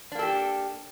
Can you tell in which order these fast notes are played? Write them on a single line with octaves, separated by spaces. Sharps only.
D4 A#3 A4 G4